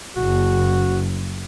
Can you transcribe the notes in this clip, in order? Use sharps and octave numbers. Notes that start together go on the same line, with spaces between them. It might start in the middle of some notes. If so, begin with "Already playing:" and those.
F#1 F#4